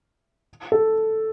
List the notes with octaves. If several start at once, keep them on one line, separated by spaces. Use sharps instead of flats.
A4